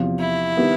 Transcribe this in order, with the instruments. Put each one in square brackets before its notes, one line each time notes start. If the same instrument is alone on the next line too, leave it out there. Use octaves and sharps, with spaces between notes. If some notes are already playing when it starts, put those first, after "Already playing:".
Already playing: [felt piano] E2 C3 F3
[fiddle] E4
[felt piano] D#3 G3 B3